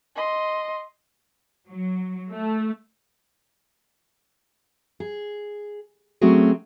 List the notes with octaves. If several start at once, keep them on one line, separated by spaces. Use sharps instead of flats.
D#5 C6
F#3
A3
G#4
F#3 A3 C4 C#4 F#4 G#4